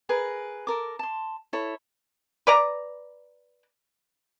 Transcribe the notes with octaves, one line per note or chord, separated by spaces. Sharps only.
G#4 A#4 B4
A4 A#4 D6
A5 C6
E4 A4 C#5 B5
B4 D5 A#5